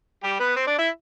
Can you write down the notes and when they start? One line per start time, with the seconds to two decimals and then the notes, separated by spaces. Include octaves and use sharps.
0.23 G3 G4
0.40 B3 B4
0.56 C4 C5
0.67 D4 D5
0.78 E4 E5